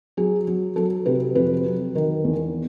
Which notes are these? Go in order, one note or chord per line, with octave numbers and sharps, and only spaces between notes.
F#3 G#4
F#3
F#3 A4
C3 B4
F2 B4
F#3
D#3 A#4
E2